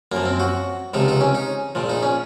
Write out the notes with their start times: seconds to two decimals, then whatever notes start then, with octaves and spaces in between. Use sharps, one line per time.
0.12 F#2 F3 A#3
0.25 C4
0.40 F#4
0.94 C#2 C3 F3 D#4
1.08 D#4
1.20 C#4
1.35 D#4
1.75 A#1 A#2 F3
1.89 D#4
2.02 C#4